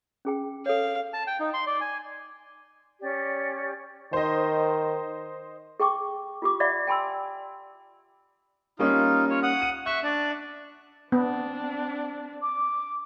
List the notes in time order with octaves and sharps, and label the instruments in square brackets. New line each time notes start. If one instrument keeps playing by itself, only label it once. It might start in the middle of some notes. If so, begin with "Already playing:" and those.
[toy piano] C#4 G#4 G5
[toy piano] A4 C#5 [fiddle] F5
[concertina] A5
G5
D#4
C6
D5
G#5
[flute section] C#4 G4 D5
[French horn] D#3 [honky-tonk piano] C5 D#5
[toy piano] G#4 G5 C#6 D6
F4 G4 D6
D5 E5 F#5 B5
G5 G#5 B5 C6 E6
[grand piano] G3 A#3 C#4 [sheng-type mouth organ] D#4 F4
[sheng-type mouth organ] F4 C#5
F#5 D#6
[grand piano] D#7
[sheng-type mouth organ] E5 C#6 [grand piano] F#6
[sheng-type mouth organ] D4 D5
[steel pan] B3 [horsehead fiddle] C4 D4
[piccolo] D6